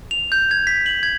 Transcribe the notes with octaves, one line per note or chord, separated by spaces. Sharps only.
F7
G6
G#6
B6
F#7
G#6